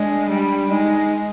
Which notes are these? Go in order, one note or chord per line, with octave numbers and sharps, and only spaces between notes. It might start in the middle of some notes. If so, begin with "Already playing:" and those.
Already playing: G#3 D4
G3
G#3 D#4